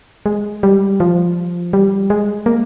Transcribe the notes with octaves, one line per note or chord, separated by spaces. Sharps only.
G#3
G3
F3
G3
G#3
A#3